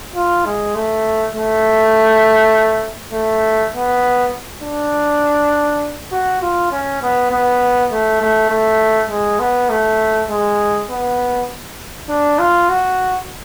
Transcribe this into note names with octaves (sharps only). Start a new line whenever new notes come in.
F4
G#3
A3
A3
A3
B3
D4
F#4
F4
C#4
B3
B3
A3
A3
A3
G#3
B3
A3
G#3
B3
D4
F4
F#4